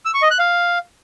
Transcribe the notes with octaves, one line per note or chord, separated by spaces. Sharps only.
E6
C#6
D#5
F#6
F5